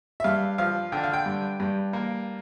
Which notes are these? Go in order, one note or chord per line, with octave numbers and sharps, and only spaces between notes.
E5
G2 F5
F3 F5
D3 G5
F5
G5
G2
G2
A#3